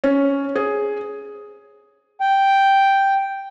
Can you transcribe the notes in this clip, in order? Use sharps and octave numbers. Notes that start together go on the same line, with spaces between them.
C#4
G#4
G5